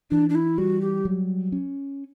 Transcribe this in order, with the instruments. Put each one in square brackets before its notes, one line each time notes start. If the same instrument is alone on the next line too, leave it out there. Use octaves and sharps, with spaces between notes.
[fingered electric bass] E3 [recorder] D4
[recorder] D4
E4
[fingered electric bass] G3 [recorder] F#4
[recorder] G4
[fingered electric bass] F#3
C#4